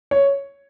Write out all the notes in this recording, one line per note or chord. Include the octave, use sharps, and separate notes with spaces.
C#5